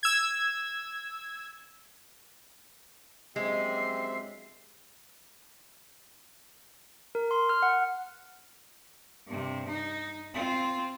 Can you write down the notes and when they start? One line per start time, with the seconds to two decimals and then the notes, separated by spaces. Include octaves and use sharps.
0.03 E6 G#6
3.36 A#1 F#2 G#3 C4 G4 E5 C7
7.15 A#4
7.31 C6
7.49 F6
7.62 F#5
9.27 G2 C3
9.68 D#4
10.34 C4 F4